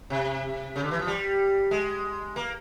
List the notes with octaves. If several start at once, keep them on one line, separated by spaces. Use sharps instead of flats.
C3
C#3
D3
E3
F3
G3
G#3
A#3